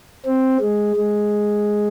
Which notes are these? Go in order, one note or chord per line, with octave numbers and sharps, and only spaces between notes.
C4
G#3
G#3